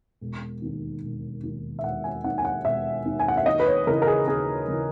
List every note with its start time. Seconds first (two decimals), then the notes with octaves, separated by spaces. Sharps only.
0.21 E1
0.62 D#2 D#3
1.02 E1
1.43 D#2 D#3
1.79 E5
1.83 E1 F#5
2.04 G#5
2.24 D#2 D#3 F#5
2.38 G#5
2.45 F#5
2.65 E1 E5
3.06 D#2 D#3
3.19 G#5
3.28 F#5
3.37 E5
3.46 D#2 D#5
3.60 B4
3.67 C#5
3.87 C#3 E3 A#4
4.02 A#4
4.07 G#4
4.28 D#2 G#4
4.68 C#3 E3